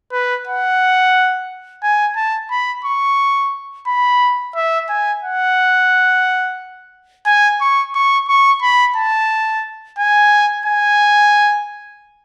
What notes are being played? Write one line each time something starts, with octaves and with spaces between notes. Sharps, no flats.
B4
F#5
G#5
A5
B5
C#6
B5
E5
G#5
F#5
G#5
C#6
C#6
C#6
B5
A5
G#5
G#5